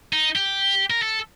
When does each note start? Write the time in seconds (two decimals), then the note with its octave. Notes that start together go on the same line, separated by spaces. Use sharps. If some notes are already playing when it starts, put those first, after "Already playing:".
0.13 D#4
0.36 G4
0.90 A#4
1.02 A4